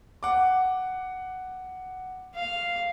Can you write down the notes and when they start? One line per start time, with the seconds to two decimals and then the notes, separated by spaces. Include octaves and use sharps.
0.23 F#5 D6
2.35 F5